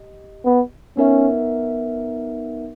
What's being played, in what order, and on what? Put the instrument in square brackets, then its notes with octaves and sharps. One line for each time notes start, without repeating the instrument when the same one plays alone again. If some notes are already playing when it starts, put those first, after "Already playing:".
Already playing: [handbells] G4 D#5
[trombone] B3
[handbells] B3 D#4 A#4 E5 [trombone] C#4